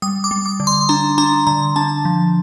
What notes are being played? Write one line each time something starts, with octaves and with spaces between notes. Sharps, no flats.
G3 D#6
D6
G3
D6
D3
C6
D4 A#5
D4 A#5
D3 A#5
D4 A5
F3